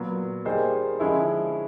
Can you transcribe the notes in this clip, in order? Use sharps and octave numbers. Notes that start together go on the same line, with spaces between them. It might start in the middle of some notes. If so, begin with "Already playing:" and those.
Already playing: A#2 F#3 B3
G3 A#3 D#4 G#4 C5
D3 F3 G#3 C#4 E4